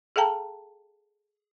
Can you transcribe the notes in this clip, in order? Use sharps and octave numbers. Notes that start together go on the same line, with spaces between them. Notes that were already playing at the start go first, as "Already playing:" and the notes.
G#4 A4 F5 G5 A5 A#5